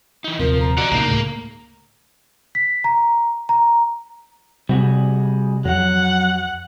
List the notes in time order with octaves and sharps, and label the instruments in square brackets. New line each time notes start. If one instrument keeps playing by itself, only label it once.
[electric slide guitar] E3 D#4
[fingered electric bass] D#1 C3 [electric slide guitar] F3 [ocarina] A#4
[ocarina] A#5
[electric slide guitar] F#4 D#5 [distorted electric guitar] D5 F#5
[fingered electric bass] C#2 A#2 [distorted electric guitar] A#3 [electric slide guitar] D4 D#4
[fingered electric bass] A2 [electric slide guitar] C#3
[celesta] B6
A#5
A#5
[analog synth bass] C3 [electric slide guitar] G3 F#4 G#4
[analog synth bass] F2 [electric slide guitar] F#3 [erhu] F#5